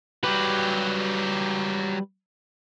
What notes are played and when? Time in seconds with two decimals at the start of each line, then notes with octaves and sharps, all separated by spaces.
0.24 F#3 G3 G4 B4